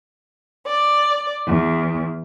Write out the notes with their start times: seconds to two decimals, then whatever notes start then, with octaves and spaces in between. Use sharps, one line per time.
0.66 D5
1.45 E2